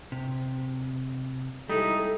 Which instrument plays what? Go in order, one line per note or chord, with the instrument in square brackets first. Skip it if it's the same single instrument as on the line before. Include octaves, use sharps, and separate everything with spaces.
[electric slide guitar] C3
[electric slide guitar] G3 G#3 E4 [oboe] D#4 [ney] A4